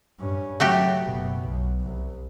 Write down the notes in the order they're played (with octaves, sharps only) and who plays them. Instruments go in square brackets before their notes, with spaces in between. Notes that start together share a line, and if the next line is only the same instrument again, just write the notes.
[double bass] G2 C#4
[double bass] C#3 F#3 [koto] A3 F#4 G4
[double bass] F#1 B2
B1
C2